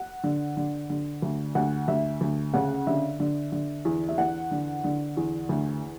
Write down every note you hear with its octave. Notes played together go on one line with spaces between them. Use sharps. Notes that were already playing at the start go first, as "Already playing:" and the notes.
Already playing: F#5
D3
D3
D3
D2
D2 F#5
D2 E5
D2
C#3 F#5
D3 E5
D3
D3
E2
E5
E2 F#5
D3
D3
E2
D2